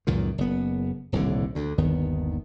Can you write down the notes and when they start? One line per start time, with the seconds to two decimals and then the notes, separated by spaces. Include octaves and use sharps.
0.07 C#2 F#2 A#2 D#3
0.38 F#1 B3
1.12 D#1 C2 A2 D3
1.55 D2 D3
1.78 G1 D#2 D#3 B3